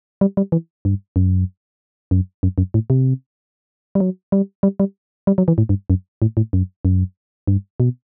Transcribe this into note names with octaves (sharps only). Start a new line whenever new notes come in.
G3
G3
E3
G2
F#2
F#2
F#2
F#2
A2
C3
G3
F#3
G3
G3
G3
G3
F#3
E3
A2
G2
F#2
A2
A2
F#2
F#2
G2
B2